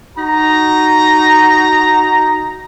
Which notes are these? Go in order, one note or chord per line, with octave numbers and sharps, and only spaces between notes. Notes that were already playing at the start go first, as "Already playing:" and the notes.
D#4 F#4 A#5